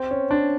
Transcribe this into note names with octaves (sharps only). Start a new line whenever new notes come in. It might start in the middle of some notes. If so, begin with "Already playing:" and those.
Already playing: C4
C#4
D4